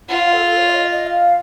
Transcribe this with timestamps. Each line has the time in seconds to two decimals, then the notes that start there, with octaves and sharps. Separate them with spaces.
0.09 F4 F#5
0.22 F5
0.33 A4
0.46 A4
0.57 C#5
0.69 F5
0.75 D#5
0.91 D#5
1.07 F5